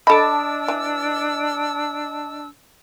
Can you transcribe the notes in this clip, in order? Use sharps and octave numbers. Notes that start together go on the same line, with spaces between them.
D4 A4 D#5 A5 B5 D6 E6
E3